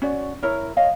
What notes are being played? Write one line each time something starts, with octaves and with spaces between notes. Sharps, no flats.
C#4 F#4 D5
E4 A#4 C#5
C#5 D#5 F5